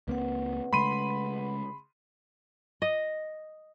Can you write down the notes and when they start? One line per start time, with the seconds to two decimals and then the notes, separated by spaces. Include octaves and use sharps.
0.08 C#2 A#3 C4 B4 F#5
0.73 C#3 G#3 A3 B5 C6 D#7
2.82 D#5